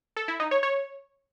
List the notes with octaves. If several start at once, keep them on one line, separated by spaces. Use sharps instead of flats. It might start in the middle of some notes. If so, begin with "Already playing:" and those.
A4
E4
D#4
C#5
C#5